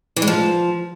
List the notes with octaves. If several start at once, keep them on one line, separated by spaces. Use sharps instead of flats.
E3
G#3
F3